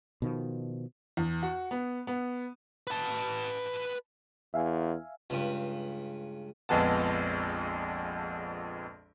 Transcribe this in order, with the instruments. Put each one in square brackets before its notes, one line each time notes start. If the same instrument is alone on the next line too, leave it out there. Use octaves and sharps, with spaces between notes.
[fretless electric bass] B2 D#3 F3
[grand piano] E2
F#4
B3
B3
[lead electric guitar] B4 A5
[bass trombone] E2 [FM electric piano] E5 F5 G#5
[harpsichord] C#2 G2
[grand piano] A#1 F2 G#3 B3 A5